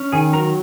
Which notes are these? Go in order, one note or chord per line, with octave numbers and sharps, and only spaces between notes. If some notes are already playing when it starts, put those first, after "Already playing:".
Already playing: C#4
D#3 G#4 G#5
F#3 A#4 A#5